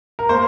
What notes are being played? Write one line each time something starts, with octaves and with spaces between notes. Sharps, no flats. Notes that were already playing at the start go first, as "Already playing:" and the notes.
A#4
A#3 C5